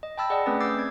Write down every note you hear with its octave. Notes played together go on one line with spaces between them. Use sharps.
D#5
G5 A5 B5 E6 A6
G#4 D5 D#5 F#5
A3 C4 C#4 B4 D#6 A6
D6 E6 G6 A6 C7
C4 G#6